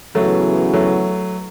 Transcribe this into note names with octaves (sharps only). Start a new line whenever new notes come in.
C#3 E3 F#3 A3 B3 F#4
F#3 A3